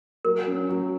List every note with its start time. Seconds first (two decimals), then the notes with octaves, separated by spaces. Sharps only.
0.25 F#3 A#4
0.47 C#4
0.69 F#3